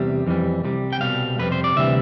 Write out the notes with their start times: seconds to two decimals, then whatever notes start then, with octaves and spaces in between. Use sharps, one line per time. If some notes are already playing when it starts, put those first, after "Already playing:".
Already playing: E2 C3 G3
0.27 F2 E3 G3
0.64 C2 C3 G3
0.93 G5
1.01 C2 B2 G3 F5
1.39 F2 C3 G3 B4
1.52 C5
1.64 D5
1.76 D2 C3 E3 G3 E5